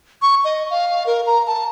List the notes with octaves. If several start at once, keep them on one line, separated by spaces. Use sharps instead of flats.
C#6
D#5
F5
A#4
A#5
A5